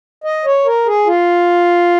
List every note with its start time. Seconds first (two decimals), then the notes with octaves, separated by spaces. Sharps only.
0.24 D#5
0.45 C#5
0.66 A#4
0.86 G#4
1.06 F4